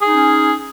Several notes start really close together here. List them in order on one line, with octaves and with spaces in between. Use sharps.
G#4 D#4 C#4